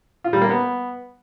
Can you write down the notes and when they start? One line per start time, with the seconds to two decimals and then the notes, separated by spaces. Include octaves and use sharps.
0.24 F4
0.33 G3
0.42 A#3
0.50 B3